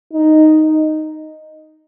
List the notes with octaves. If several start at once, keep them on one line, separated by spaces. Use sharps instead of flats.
D#4